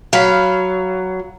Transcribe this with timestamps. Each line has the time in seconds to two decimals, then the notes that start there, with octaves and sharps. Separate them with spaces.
0.13 F#3 F5 B5